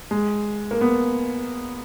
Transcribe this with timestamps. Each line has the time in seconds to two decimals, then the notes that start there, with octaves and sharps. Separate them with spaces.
0.11 G#3
0.71 A#3
0.81 B3